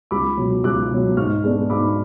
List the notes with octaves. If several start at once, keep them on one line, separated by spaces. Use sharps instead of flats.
C#2 B5 D6
B2 F#3
C#2 D6 F#6
B2 F#3
G#2 C#6 F6
G#3 B3 D4
G#2 B5 D6